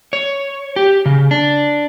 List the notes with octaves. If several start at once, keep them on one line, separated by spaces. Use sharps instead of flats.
C#5
G4
C#3
D4